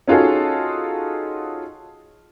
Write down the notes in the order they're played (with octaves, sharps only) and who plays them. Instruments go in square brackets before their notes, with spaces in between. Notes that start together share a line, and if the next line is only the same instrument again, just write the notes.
[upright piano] C#4 D#4 F4 F#4 G#4 A4